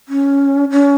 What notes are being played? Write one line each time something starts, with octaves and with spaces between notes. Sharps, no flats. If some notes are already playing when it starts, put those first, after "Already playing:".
C#4
C#4